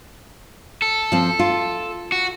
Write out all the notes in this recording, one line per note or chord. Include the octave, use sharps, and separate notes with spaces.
A4
F3 C4
F4
F#4